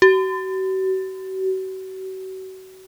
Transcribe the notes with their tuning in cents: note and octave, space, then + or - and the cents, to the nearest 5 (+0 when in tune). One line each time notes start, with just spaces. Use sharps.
F#4 +40